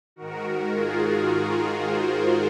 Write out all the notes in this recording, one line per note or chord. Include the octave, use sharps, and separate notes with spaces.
G#2 D#3 F#4 A#4
F4 G#4
G#4 C5